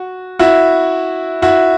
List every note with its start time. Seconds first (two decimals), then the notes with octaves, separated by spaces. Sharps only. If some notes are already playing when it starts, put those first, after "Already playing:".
Already playing: F#4
0.39 E4 F#4
1.42 E4 F#4